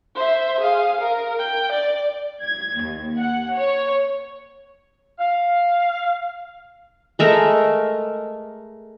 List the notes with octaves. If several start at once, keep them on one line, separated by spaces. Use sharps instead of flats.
C5 E5
G#4 F5
A#4
G5
D5
G#6
D#2
F#5
C#5
F5
G#3 A3 A#4